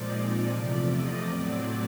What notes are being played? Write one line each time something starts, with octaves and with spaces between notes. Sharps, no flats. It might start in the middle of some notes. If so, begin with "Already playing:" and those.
Already playing: A#2 F3 G#3 C4 D#4 D5
E2 C3 F3 A3
D#5
A2 F#3 A3 C4 D5